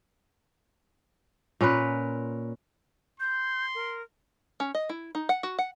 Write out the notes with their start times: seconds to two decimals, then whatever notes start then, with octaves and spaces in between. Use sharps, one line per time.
1.61 A#2 C#4 A#4 B4
3.20 C6 G6
3.75 A#4
4.60 C#4
4.75 D#5
4.89 E4
5.15 D#4
5.29 F#5
5.43 F#4
5.59 F#5